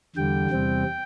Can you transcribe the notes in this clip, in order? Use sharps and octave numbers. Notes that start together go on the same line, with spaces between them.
E2 D3 G3 G5
E2 C3 G3 C4